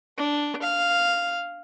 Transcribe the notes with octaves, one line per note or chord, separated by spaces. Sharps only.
D4
F5